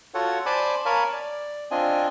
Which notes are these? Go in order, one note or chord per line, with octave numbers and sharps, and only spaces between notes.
F4 F#4 A4 C#5 F#5
C5 D5 G#5 A5 B5 D6
A#4 C#5 F5 G#5 A5 B5
D5
C4 D4 F4 D#5 G#5